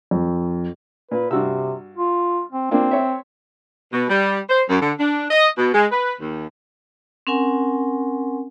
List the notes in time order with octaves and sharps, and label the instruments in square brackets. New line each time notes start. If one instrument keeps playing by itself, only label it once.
[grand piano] F2
[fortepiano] A#2 [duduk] B4
[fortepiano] G2 F#4 E6 [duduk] C3
[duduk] F4
C4
[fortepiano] A#3 D4 F4 [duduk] C4
[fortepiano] C#5 E5
[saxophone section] B2
G3
C5
F#2
D3
D4
D#5
B2
G#3
B4
D#2
[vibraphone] C4 C#4 A#4 F#5 G#5